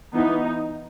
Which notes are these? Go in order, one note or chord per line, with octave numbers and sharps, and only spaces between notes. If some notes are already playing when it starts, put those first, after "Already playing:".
E3 B3 D#4